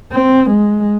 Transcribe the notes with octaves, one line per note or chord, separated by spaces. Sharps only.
C4
G#3